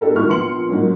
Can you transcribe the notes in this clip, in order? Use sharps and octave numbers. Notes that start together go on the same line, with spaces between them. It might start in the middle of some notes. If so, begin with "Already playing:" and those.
A#3 D4 G4 A4 A#4
G#1 G#2 E4 A#4 C#6 F6
A#1 A#2 B3 C6 C#7 F#7
G#2 F#3 A#3 C#4